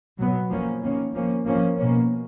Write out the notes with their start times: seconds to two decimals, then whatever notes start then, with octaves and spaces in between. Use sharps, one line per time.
0.18 B2 F#3 B3
0.49 F3 A#3 C#4
0.82 D#3 A#3 C#4
1.13 F3 A#3 C#4
1.45 F3 A#3 C#4
1.78 B2 A#3 C#4